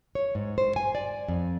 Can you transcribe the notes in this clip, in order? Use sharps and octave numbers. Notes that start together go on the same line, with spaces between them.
C#5
G#2
C5
G#5
D5
F2